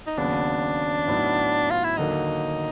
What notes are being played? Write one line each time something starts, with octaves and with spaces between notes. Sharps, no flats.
D#4
D#2 C#3 F#3 B3 D4
A2 F#3 B3 D#4
F4
E4
D#2 D3 F#3 A#3 D#4